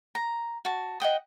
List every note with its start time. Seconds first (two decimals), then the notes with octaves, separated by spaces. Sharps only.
0.15 A#5
0.65 F#4 A5
1.00 D#5 F#5 G5 D#6